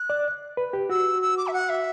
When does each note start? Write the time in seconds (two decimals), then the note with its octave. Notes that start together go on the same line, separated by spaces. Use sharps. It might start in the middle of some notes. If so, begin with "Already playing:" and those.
Already playing: F#6
0.10 D5
0.57 B4
0.73 G4
0.90 F#4 E6
1.22 E6
1.37 D6
1.47 E5
1.53 F#5
1.69 E5